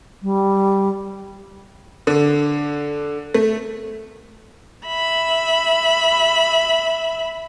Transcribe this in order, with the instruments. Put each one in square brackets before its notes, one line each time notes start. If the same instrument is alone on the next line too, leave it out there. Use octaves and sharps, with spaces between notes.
[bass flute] G3
[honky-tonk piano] D3
A3
[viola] E5 B5